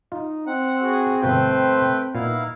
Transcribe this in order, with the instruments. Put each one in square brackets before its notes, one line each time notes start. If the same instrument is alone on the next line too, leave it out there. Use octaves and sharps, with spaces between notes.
[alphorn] D#4 [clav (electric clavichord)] F4
[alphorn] C4 [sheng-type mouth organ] F#5
[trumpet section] F#4 G#4
[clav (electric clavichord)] G1 B2 F4 [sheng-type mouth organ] A3 B4 G5 [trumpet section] C5
[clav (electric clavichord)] A#2 [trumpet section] B3 D#4 [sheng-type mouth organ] E4 F5